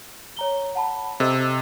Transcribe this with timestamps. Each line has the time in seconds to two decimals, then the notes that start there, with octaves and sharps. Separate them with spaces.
0.37 C#5 A#5 G7
0.75 F#5 A5 B5
1.20 C3 A4 D#5 E6